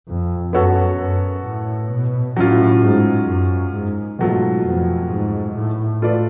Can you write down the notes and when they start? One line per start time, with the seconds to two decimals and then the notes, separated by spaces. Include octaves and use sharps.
0.08 F2
0.53 F#2 B3 F#4 A4 C#5
1.00 F#2
1.45 A2
1.90 B2
2.36 A2 F#3 C#4 F4
2.83 G#2
3.28 F#2
3.73 G#2
4.19 G#2 B2 F#3 A3 F4
4.65 F2
5.10 G#2
5.56 A2
6.02 A3 F4 B4 D5